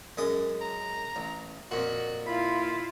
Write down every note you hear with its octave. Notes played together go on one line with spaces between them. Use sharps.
F#2 G#3 D#6
A#5
A1
F2 A#2 F#4
E4 F4 B5